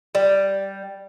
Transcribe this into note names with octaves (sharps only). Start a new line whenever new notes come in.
G3